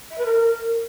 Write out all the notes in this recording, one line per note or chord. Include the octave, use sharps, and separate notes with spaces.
E5
B4
A#4